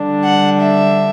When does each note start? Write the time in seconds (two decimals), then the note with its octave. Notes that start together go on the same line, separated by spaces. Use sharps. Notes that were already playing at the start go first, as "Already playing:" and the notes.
Already playing: D3 G3 D4
0.25 F#5
0.62 E5